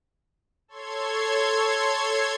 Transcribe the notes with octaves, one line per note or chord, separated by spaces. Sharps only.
A4 C#5 C6 G#6